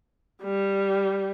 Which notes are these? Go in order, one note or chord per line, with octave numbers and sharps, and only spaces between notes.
G3